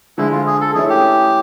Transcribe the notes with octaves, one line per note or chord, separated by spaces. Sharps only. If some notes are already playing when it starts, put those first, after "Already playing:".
D3 F3 G#3 E4
F4
G#4
A4
E3 A3 C#4 E4 G#4
G4